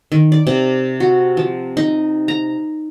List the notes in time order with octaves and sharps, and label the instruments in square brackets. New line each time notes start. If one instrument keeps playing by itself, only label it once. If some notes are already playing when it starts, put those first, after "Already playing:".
[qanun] D#3
D5
C3
F#4
F3
D#4
A#5